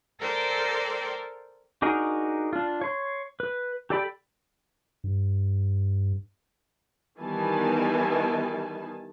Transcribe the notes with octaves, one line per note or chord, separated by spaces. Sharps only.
A4 A#4 C5 D5 G5
D4 D#4 F#4 G#4 A#4
D4 F4
C#5 C6
B4
G4 A4 D5 G5 B5
G2
D#3 E3 G3 B3 G#5 A5